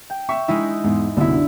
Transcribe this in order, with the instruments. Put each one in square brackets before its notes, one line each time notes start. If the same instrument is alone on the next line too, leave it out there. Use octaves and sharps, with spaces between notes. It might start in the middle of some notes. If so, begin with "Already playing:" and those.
[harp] G5
[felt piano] E5 C#6
[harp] G#3 D#4 E4
[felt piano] E2 G#2
[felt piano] C2 F#2 B2 [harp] D3 E4